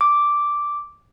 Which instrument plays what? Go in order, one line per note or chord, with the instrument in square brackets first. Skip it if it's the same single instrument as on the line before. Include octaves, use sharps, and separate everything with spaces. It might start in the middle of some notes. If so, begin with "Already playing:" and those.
[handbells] D6